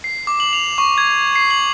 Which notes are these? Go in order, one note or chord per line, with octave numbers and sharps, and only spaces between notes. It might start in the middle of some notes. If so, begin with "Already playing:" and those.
C7
D6
F#7
F7
C#6
G#6
C7
F#7